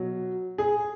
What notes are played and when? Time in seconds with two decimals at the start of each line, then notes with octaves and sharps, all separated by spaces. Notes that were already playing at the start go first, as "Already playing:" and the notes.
Already playing: B2 F#3
0.58 G#4